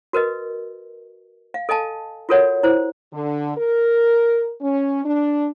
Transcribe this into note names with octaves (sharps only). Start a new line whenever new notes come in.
F#4 A#4 B4 D#5
F5
A4 D#5 F5 G#5 A5
F4 F#4 A4 A#4 C#5 F#5
E4 C5
D3
A#4
C#4
D4